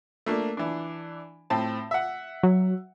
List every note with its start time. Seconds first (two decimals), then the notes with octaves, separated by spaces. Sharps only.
0.26 A3 A#3 D4
0.57 E3 D4
1.50 A2 C4 A5
1.91 E5 F#5
2.43 F#3